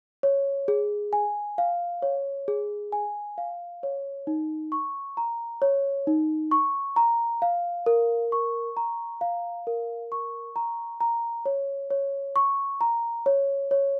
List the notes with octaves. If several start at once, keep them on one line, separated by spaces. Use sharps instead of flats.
C#5
G#4
G#5
F5
C#5
G#4
G#5
F5
C#5
D#4
C#6
A#5
C#5
D#4
C#6
A#5
F5
A#4
C#6
A#5
F5
A#4
C#6
A#5
A#5
C#5
C#5
C#6
A#5
C#5
C#5